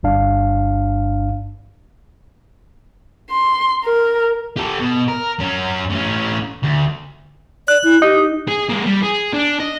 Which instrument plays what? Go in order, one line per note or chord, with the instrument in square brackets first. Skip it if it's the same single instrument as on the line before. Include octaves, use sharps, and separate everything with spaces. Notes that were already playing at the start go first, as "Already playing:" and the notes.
[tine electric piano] G1 G2 D4 F5
[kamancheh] C6
A#4
[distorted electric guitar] G4 A4
B2
A#4
F#2 C#4
A2 C#4
D2
[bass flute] D5 [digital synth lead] F#6
[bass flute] E4
[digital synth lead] D#4 [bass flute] G4
[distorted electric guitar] G#4
G#3 A#3
G3
G#4
D4
D#5